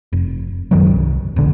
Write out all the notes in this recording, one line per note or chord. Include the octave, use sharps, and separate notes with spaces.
F1
A1 F#2 D#3 F#3
C2
E1 A#1 D3